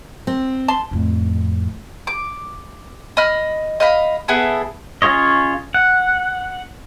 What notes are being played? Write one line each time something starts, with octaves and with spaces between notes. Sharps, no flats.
C4
A5 C6
F2 A2
D6
D#5 B5 F6
D#5 F5 B5
B3 E4 G#4 A4
C#4 F4 G#4 C#5 D#5
F#5